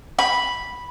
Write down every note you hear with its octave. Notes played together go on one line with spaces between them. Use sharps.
B5